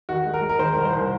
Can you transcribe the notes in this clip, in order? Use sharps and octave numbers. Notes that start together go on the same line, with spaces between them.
D#3 F#4
G#3
A#4
G#3
A#4
D#3 C5
C2 A#4
C5
C2